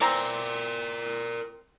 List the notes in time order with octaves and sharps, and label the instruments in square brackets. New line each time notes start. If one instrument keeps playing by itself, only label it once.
[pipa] E3 C4 A#5 [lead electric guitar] A#4 D5